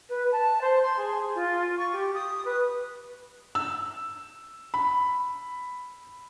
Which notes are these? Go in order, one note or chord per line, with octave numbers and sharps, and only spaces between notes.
B4
A5
C5
C6
G#4
G#4
F4
C#6
G4
D#6
B4
E6
B5